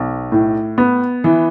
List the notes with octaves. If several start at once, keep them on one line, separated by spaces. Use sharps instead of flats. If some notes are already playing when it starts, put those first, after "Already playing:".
Already playing: B1
A2
B3
E3